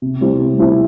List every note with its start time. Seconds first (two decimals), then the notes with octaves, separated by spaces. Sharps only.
0.02 C3
0.21 G3 C4 E4 C5
0.40 C3
0.58 G3 C4 E4 C5